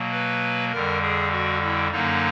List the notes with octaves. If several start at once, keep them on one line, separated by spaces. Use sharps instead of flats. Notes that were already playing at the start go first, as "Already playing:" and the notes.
Already playing: B2 F#3 A#3
B4
F2 D3 G3 A#4
G#4
F#4
E4
F#2 D3 F#3 A#3 D#4